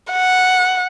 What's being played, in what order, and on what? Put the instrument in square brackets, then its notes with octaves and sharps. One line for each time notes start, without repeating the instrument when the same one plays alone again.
[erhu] F#5